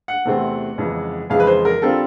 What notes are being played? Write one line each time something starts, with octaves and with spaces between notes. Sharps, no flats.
F#5
E2 C3 E3 A3 C4
F2 C#3 E3 G#3
F2 C#3 E3 G#3 F5
B4
C5
A#4
D3 G3 C4 F4 A4